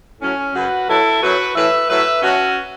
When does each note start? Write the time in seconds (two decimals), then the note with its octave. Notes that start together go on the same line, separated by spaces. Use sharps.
0.21 A2 F#3 C#4
0.55 F#2 C#3 F#3 F#4 B4
0.88 B2 F#3 E4 A4
1.22 F#2 F#3 F#4 B4
1.55 A2 E3 B4 E5
1.89 A2 F#3 B4 E5
2.22 B2 F#3 C#4 F#4